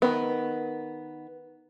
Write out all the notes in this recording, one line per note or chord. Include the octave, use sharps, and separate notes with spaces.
D#3 B3